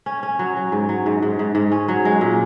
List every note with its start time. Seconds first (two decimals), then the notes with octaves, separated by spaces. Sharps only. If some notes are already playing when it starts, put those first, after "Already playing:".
0.06 C#4
0.23 C#4
0.39 F#3
0.57 F#3
0.72 G#2
0.89 F#3
1.06 G#2
1.22 G#2
1.39 G#2
1.55 G#2
1.72 C#4
1.88 F#3
2.05 G#3
2.21 A#2